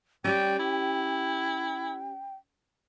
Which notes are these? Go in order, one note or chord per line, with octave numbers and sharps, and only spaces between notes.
G3 C#4 G4 G5
E4